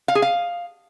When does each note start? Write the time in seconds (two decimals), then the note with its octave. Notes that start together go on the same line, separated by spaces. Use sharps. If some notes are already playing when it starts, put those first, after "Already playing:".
0.08 F5
0.15 G#4
0.22 F5